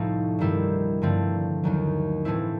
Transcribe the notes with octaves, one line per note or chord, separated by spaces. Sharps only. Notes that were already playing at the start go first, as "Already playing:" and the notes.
Already playing: C2 A2 F3 A3 C4 D#4
G2 D#3 G3 C4 E4
G2 D3 F3 A3 C4
D#2 D#3 F#3
A2 E3 A3 C4 E4